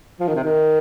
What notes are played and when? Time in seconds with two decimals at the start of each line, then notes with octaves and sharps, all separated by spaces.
0.20 F3
0.28 D#3
0.35 C3
0.44 D#3